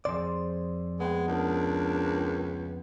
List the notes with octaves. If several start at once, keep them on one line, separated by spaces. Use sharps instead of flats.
F2 A#2 G#4 C5 D5
G#3 B3 G5
C#2 D4 A#4